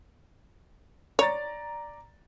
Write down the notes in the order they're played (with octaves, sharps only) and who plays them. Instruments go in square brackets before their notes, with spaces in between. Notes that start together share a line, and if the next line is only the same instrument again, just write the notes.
[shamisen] C#5 [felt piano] D5 A#5 A6